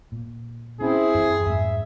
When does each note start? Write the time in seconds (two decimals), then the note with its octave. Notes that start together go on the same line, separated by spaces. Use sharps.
0.12 A#2
0.81 C4 C#4 E4 G#4
1.15 F#2 E3
1.45 F2 G#2 G#3 E5